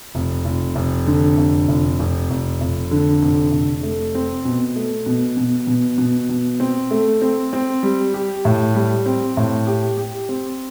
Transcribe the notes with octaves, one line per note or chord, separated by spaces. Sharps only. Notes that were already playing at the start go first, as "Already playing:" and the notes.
F1
F1
F1
D3
F1
F1
F1
F1
F1
D3
F1
F1
A3
C4
B2
A3
B2
B2
B2
B2
B2
C4
A3
C4
C4
G3
G4
A2
G3
C4
A2
G4
G4
C4